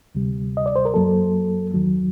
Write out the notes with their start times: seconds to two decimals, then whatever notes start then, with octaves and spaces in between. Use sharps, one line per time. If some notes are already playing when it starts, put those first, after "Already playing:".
0.15 D2 C3 G3
0.57 D#5
0.66 D5
0.76 C5
0.85 A#4
0.94 F#2 F#3 A#3 A4
1.74 D#2 D#3 F#3